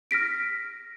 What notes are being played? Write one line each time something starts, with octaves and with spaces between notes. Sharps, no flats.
F6 A#6 B6 D7